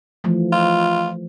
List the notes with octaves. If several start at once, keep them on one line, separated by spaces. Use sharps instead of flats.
E3 F3 A3
F4